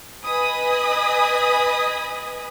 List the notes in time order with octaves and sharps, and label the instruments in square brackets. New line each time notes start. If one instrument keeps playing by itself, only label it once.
[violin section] B4 D#5 G#5 B5 D#6